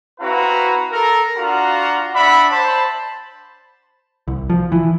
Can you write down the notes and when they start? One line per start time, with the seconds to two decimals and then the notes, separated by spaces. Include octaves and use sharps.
0.21 C4 E4 F#4 B4 F5 A#5
0.93 A4 A#4
1.37 D4 F4 F#4 F5 F#5 A#5
2.14 D4 D5 E5 F#5 B5
2.50 C5 A5 B5
4.28 C2
4.50 F3
4.72 E3